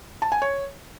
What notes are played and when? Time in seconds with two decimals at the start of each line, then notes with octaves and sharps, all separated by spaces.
0.22 A5
0.32 G#5
0.42 C#5